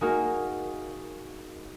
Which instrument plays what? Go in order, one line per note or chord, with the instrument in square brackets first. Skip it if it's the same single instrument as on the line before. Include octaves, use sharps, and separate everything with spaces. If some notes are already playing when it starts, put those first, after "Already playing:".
[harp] G#3 A#3 D#4 F#4 A#4